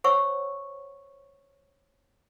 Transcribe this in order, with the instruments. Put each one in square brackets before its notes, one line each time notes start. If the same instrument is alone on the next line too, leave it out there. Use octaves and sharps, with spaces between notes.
[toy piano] C5 C#5 F#5 C#6 E6